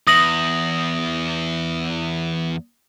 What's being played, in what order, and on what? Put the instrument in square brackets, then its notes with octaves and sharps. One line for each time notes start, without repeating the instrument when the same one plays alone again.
[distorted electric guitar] E2 [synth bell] D#6 A#6 F#7